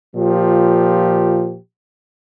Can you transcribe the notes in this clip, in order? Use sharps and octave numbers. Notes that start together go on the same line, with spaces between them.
A#2 F3 G4